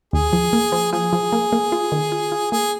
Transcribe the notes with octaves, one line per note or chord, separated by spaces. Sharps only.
D#2 G#4
F3
A#3
F3
F3 G#4
F3
A#3
A#3
F4
D#3
F4
F4
A#3 G#4